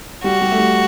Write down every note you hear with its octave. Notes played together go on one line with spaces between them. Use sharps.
G3 F#4
G3
A3
G3